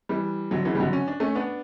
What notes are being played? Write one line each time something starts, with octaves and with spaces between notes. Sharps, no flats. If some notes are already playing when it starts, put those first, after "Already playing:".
E3 G3
D3 F#3
C#3 E3
G3
D3 F#3
C#4
D4
A3 C#4
B3 D4